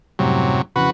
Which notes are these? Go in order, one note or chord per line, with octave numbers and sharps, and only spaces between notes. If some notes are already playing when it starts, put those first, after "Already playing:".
F#2 A2 C3 F#3 G3
F2 C#3 E3 F#4 B4